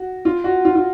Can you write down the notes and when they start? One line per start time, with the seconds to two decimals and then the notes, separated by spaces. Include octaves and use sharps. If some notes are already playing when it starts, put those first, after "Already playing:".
Already playing: F#4
0.25 F4
0.44 F#4
0.65 F4
0.75 F4